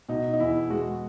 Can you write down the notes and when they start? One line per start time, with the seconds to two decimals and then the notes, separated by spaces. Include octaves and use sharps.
0.09 B2 D#4
0.33 D#4
0.40 E2 E4
0.70 G#3 F#4